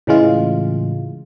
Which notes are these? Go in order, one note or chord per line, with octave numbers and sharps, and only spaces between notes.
A2 C#3 E3 G#3 F4